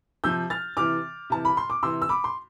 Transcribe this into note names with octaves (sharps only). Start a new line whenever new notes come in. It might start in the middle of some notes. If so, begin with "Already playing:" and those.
C3 F3 E6 G6
F6 A6
C3 E3 D6 F6
C3 E3 A5
B5
C6
D6
C3 E3 C6 E6
E6
B5 D6
C6